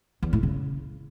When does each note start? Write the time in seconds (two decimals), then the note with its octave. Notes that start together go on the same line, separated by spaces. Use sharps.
0.23 E2
0.33 A2
0.43 C#3